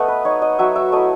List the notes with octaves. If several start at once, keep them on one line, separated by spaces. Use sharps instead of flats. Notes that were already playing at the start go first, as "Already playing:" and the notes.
Already playing: A3 B3 D#5 F#5
B4
D#4 C#5
D#5
F#3 E5
E5
A3 E4 D#5